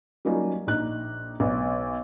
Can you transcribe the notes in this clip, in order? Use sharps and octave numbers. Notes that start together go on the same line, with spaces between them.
F#3 G3 A#3 C#4 D#4 F4
A#1 D#4 F#6
B1